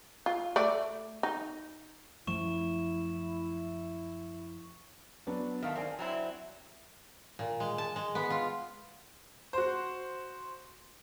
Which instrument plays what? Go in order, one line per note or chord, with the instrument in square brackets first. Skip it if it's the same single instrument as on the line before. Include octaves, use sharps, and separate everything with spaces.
[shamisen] F4
A3 D5
D#4
[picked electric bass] F#2 F3 A3 [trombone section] E4 [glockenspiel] C#6 E7
[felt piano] F#3 B3 D4
[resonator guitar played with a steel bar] D#3 A3 [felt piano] E5 F5 A5
[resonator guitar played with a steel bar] C4 [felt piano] A#4 D5 G#5
[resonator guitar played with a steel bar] F#3 C4 E4
[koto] A#2
G#3
A5
G#3
B3
F4
[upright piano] F#4 C5